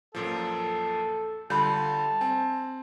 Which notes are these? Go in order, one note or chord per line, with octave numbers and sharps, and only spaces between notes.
F#2 A#2 F3 A4
D3 G3 F4 A5 B5 G6
C4 G#5